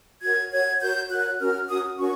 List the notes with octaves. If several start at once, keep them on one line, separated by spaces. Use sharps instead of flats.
F#4 A#4 C#5 G#6
F#4 A#4 C#5 G#6
F#4 A#4 C#5 G6
F#4 A#4 C#5 F#6
C#4 F#4 A#4 F6
C#4 F#4 A#4 D#6
C#4 F#4 A#4 C#6